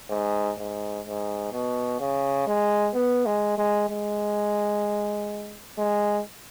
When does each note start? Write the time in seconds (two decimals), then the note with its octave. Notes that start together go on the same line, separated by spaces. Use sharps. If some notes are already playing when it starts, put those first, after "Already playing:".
0.10 G#2
0.58 G#2
1.05 G#2
1.53 B2
2.00 C#3
2.47 G#3
2.94 B3
3.26 G#3
3.58 G#3
3.90 G#3
5.79 G#3